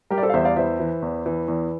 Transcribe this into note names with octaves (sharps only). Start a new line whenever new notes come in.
G3 G4 A#4
D5
A4 C5
F5
E2 C5 E5
D5 F5
E3 C5 E5
E3
E2
E3
E2